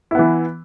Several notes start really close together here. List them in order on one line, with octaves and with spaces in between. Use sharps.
E4 B3 E3